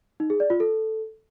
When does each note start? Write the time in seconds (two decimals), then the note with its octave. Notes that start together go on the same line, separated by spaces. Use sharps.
0.20 D#4
0.30 G#4
0.40 D5
0.50 F4
0.60 A4